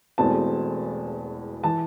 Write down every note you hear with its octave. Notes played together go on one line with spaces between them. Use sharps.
E1 E2 B2 A3 C4 A5
E3 A5